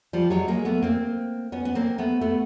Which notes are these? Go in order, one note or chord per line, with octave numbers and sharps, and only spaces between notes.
F3 G3
F#3 G#3
G#3 A#3
A3 B3
A#3 C4
B3 C#4
B3
A#3 C4
A3 B3
A3 B3